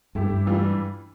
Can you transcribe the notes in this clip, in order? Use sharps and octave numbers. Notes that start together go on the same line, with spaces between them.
G2 A3 E4 G4
G2
E3 G3 D4 F4